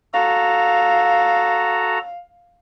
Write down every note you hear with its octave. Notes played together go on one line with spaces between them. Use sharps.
F#4 A4 F5 A#5